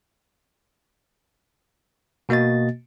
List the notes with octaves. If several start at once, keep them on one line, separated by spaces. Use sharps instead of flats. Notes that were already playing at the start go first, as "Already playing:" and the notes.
B2 A#3 F#4 D#5 A6